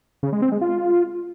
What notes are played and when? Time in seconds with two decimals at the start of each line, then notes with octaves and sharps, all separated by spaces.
0.23 C#3
0.33 G#3
0.42 C4
0.52 G#3
0.61 F4